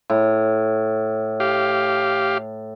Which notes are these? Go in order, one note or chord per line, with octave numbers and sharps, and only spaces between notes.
A2
G4 F5